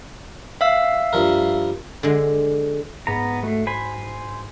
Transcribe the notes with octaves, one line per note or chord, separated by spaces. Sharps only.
E5 F5 E6
G2 F3 A#4
D3 G#3
G#2 B3 A#5
A3 F#4 C7
C5 G#5 B5